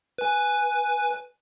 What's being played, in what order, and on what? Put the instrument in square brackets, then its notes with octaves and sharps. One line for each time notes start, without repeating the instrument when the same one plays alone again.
[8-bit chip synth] B4 G#5